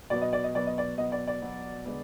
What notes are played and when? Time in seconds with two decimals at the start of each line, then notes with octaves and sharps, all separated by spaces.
0.10 B2 F#3 B3 D5
0.22 D#5
0.33 D5
0.44 D#5
0.54 B2 F#3 B3 D5
0.67 D#5
0.78 D5
0.98 B2 F#3 B3 D#5
1.12 D5
1.27 D5
1.42 B2 F#3 B3
1.85 D3 G#3 B3